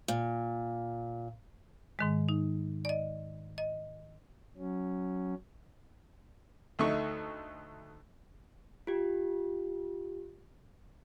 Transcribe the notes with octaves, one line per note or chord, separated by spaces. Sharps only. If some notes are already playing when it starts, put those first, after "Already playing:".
A#2
G#2 D#3 G#3
D#4
D5 D#5
D#5
F#3 C#4
D2 A3 D#4 C#6
F4 G4